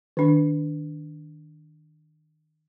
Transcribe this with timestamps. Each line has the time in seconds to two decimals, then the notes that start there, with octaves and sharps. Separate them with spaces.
0.17 D#3 D4